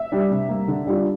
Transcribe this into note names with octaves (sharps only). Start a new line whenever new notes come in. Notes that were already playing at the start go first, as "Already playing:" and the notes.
Already playing: E5
G3 D4
C3
G3 A#3
D3
G3 D4 F4